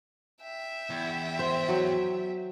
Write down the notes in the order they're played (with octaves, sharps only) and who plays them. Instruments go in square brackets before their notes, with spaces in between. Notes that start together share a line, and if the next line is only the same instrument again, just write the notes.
[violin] E5 G5
[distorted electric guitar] E2
[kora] C5
F#3